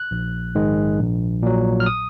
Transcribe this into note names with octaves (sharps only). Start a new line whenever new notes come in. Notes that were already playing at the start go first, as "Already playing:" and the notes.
Already playing: F#6
A#1
G#2 D#3 G#3
A#1
A#2 F#3
F6
D#6